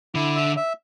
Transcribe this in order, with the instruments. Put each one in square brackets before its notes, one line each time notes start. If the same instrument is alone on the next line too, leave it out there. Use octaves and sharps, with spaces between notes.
[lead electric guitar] D3 [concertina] E4
[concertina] E5
E5